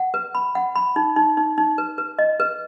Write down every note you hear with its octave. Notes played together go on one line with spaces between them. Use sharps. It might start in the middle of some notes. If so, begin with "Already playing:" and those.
Already playing: F#5
B4
B5
F#5
B5
D#4
D#4
D#4
D#4
B4
B4
D#5
B4